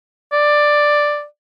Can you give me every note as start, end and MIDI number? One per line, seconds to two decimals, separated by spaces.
0.33 1.24 74